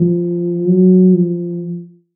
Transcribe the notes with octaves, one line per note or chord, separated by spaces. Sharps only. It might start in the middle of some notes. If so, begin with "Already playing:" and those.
Already playing: F3
F#3
F3